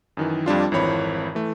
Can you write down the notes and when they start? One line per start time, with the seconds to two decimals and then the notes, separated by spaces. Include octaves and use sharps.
0.17 F#2 D#3 E3
0.46 F2 G3 D4 F4
0.72 G#1 F2 E3 C#5 B5
1.35 E3 A3